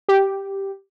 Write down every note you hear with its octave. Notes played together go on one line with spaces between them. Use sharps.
G4